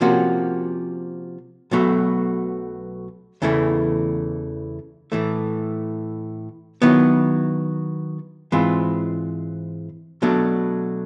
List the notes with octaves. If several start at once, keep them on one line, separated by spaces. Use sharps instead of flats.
C3 F3 A#3 C#4 F#4
B1 B2 F#3 A3
E2 C#3 E3 A3
A2 E3 A3
D#3 F#3 B3 E4
G#2 E3 G#3 C4 F4
B2 F#3 A3 D4